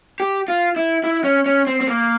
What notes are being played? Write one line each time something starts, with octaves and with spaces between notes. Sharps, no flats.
G4
F4
E4
E4
C#4
C#4
C4
C4
A#3